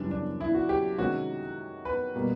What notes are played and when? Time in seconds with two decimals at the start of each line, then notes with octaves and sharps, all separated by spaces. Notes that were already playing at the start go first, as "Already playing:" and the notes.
Already playing: F#2 C#3 E3 G3 D4
0.11 D4
0.40 E4
0.54 F#4
0.69 G4
0.98 C3 D#3 G#3 C#4 F#4
1.85 B4
2.15 B2 G3 A#3